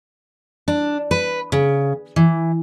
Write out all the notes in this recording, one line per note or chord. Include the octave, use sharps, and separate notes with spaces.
D4
B4
C#3
E3